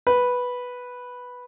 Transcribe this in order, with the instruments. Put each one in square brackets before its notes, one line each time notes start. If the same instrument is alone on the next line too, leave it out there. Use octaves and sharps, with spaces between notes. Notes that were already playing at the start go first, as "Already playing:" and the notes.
[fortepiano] B4